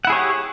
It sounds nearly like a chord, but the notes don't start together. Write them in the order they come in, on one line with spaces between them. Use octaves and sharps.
F#5 E4 G#4 C#5 G4